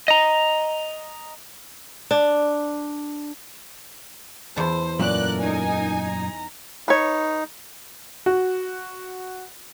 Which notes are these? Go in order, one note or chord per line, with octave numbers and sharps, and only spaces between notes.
D#5 A#5
D4
E2 C5 A5
F#2 A#2 A3 A#4 D5 F#6
D#4 G#5
A#5
D#4 B4 C#5
F#4